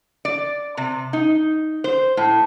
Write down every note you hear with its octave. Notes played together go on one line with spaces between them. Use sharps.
D5
C3
D#4
C5
A2